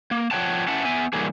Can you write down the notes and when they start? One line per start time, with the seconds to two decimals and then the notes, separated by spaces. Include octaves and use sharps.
0.11 A#3
0.31 F3 A3 C#5 F#5 G5 A5
0.68 C#4 E4 E5 F#5 A5
0.85 B3 E5 G#5
1.13 D3 E3 F#3 G3 A#3 G#4